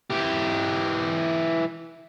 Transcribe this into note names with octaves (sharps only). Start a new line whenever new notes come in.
E3 G4